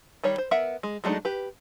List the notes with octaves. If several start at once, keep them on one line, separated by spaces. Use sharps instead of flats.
D#3 G3 C#5 B5
C5
B3 A#4 E5 F#5
G#3
F#3 G#3 A3 D4 D#4
G4 B4